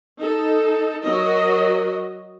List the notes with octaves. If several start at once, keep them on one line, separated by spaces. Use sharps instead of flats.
D#4 A4
F#3 F#4 A#4 D#5